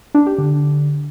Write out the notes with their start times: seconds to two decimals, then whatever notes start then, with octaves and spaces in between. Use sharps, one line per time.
0.14 D4
0.26 G4
0.38 D3